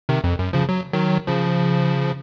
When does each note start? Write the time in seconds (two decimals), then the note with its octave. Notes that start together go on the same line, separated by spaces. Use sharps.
0.09 C3 D#3
0.24 F2
0.39 F#2
0.53 C#3 F3
0.69 F#3
0.92 D#3 F#3
1.27 C#3 F3